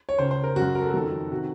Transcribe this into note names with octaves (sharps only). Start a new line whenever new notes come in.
C#5
C#2 C#3 C5
C5
A#4
F#2 C#3 F#4
A#4
A4
F#4
F2 D#3 A4
C3 D#3 F#4